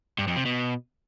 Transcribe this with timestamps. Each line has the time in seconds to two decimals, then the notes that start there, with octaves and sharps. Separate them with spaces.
0.18 G2
0.27 F2
0.36 C3
0.45 B2